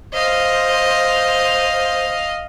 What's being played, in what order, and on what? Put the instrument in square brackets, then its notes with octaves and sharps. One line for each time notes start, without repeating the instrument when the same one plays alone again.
[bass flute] C5 [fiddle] D#5 F5